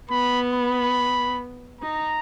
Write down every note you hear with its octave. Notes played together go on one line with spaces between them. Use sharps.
B3 B5
B5
D#4 A#5